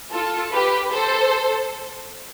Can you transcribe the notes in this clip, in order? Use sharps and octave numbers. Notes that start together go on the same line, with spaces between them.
F4 A4
G4 B4
A4 C5